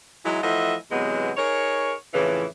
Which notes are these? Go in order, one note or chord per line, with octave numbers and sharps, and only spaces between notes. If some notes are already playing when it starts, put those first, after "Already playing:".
E3 F#3 G#3 D#4 E4
E3 F3 A3 D#5 E5 F#5
C3 E3 F#3 G#3 B3
D#4 G#4 A#4 C#5
F2 A2 C#3 E3